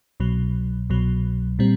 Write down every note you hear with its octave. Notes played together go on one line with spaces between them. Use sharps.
C2 B2 F#3
C2 B2 F#3
A#2 G3 C4